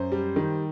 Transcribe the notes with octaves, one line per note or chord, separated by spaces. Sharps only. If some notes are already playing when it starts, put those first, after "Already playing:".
Already playing: F#2 C5
G3
D#3